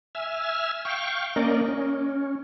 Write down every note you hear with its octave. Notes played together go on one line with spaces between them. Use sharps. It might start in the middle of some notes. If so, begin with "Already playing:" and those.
E5 G#5 E6 F6
F5 G5 C#6
A#3 C#4 A#4 D5 D#5
C#4